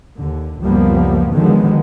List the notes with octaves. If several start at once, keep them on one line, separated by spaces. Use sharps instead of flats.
D#2 D3
C#2 F#2 F3 G3 A#3 B3
D3 D#3 F3 F#3 G#3 B3